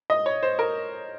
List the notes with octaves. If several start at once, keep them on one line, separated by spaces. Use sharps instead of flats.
D#5
C#5
C5
A#4